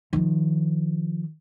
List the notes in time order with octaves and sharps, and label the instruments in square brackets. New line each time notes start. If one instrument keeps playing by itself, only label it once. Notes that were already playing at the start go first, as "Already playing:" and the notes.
[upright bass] D#3 F3